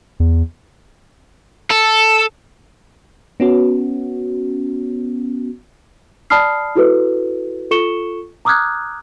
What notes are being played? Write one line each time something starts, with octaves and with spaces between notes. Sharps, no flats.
E2
A4
B3 C#4 F#4
D5 A5 B5 D#6 F6 C7
E4 F#4 A4 B4
F4 A4 C#6 C#7 E7 G7
A#5 D6 D#6 F6 F#6 G#6